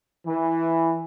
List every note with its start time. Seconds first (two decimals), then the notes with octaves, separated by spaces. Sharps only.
0.26 E3